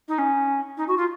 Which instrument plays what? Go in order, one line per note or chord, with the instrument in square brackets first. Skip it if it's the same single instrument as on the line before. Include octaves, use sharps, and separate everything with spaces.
[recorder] D#4
C#4
D#4
F#4
F4